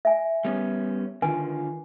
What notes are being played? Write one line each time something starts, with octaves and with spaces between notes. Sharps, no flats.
E5 G#5
G3 B3 C#4
D3 D#3 F4 B4 G#5